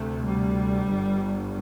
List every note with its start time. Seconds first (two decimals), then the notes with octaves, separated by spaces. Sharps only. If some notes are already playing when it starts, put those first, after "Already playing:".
Already playing: D2 C3 A3
0.26 G3
0.88 G1 G2